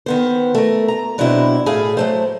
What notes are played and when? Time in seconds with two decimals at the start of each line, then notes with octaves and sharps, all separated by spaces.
0.06 D#3 B3 C5
0.55 A3 A#4
0.88 A#5
1.18 B2 F#3 C4 D4 E4
1.66 A2 G#4 E5 F5
1.97 F#3 A3 C5